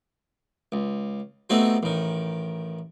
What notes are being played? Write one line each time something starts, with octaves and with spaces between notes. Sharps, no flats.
C#2
A3 B3 C4 D#4 F#4 G4
A1 D#3